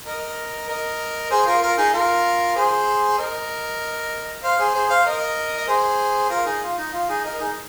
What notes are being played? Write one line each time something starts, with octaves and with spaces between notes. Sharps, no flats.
A#4 D#5
A#4 D#5
G#4 C5
F4 A#4
F4 A#4
D#4 G#4
F4 A#4
G#4 C5
A#4 D#5
C5 F5
G#4 C5
G#4 C5
C5 F5
A#4 D#5
D#5
G#4 C5
F4 A#4
D#4 G#4
F4
D#4
F4
D#4 G#4
A#4 D#5
D#4 G#4